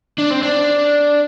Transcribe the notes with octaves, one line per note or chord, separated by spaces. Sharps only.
D4
C4
D4